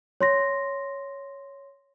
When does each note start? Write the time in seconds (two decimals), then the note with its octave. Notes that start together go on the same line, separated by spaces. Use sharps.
0.21 C#5 C6 A#6